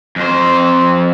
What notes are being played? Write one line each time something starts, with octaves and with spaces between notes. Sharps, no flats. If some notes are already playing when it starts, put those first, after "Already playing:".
F2 C5